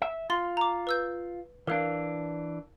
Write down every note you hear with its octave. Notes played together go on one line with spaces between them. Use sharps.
E5
F4 C6 A6
A#5 D6
B4 E6 G6
E3 D4 A#4 F5